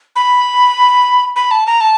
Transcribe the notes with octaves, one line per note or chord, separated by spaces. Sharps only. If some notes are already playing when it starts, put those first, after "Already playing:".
B5
B5
A5
A#5
A5